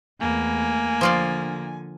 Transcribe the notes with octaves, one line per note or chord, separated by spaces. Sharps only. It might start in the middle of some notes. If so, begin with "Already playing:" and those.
E2 A3 A#3 G#5
D3 F3 F4 D5